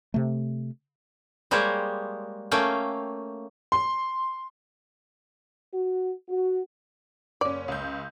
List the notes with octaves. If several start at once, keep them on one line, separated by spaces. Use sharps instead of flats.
C3 A3
G3 G#3 A#3 G4 C5 C#5
A3 A#3 C#4 F5 G5
C6
F#4
F#4
F#1 C#4 D5
C#2 G6